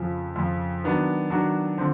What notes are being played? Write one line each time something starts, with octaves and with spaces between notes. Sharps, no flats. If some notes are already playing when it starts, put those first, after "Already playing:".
Already playing: F2 C#3 F3
F2 C#3 F3
D#3 F#3 B3 D4 F#4
D#3 F#3 B3 D4 F#4
D3 F3 C4